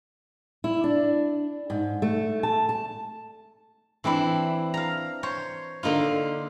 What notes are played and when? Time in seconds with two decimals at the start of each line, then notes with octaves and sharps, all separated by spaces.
0.64 E4
0.84 D4
1.70 G#2
2.02 A3
2.43 A5
2.69 A5
4.04 E3 C4 D4 E4
4.74 F5 A#5
5.23 C5 C#5
5.83 D3 A#3 D#4 F4